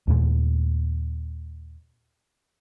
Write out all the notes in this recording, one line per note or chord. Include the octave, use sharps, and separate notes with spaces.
D#2 A#2 G#3